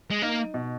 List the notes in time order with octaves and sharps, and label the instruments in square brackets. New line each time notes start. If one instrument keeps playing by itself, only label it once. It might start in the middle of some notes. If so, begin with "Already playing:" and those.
[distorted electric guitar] G#3
[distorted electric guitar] A#3 [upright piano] D#4
[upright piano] B2